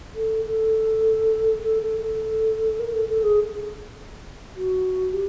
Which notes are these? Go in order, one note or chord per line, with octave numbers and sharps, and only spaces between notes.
A4
A4
A4
A4
A4
A#4
A4
A4
G#4
F#4
G4